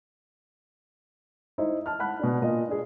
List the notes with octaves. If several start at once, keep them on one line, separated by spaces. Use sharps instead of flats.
D#4 E4 C5
A5 F6
F#5 B5 F#6
B2 D4
A#2 F4 D#5
D4 G#4